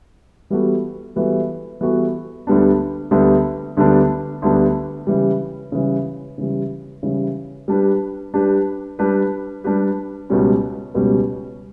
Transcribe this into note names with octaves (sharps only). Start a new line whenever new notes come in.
E3 G3 B3 F#4 A4
E3 G3 B3 F#4 A4
E3 G3 B3 F#4 A4
D2 D3 G3 B3 D4
D2 D3 G3 B3 D4
D2 D3 G3 B3 D4
D2 D3 G3 B3 D4
C#3 E3 G3
C#3 E3 G3
C#3 E3 G3
C#3 E3 G3
G3 D4 G4 B4
G3 D4 G4 B4
G3 D4 G4 B4
G3 D4 G4 B4
C#2 B2 G3 C#4
C#2 B2 G3 C#4